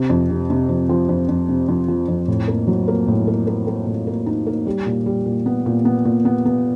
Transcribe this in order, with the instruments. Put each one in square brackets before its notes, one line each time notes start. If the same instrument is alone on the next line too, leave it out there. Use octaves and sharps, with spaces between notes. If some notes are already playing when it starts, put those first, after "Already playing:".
Already playing: [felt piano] C3
F2
C3
C3
F2
F3
F2
F2
C3
F2
F3
F2
A2
A#3
F#3
A#3
A2
A#3
A#3
A#3
A2
A#3
D#4
A#3
G3
A#2
G3
A#2
B3
A#2
B3
A#2
B3
B3